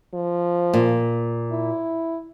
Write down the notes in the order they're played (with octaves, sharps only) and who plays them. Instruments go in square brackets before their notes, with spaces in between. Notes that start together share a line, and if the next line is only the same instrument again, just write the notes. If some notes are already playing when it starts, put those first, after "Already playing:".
[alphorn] F3
[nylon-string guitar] A#2
[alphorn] E4